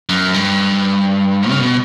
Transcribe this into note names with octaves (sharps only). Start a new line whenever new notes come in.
F#2
G2
C#3
B2